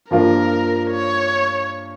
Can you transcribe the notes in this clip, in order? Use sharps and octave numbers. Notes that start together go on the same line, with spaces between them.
G2 F3 A#3 F4 A#4
C#5